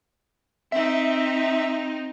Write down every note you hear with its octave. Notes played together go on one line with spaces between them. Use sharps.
C4 D#4 E5